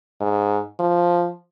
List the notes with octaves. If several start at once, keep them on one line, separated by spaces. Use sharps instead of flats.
G#2
F3